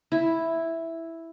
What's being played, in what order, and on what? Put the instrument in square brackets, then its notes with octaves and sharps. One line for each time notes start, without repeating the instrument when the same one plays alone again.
[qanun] E4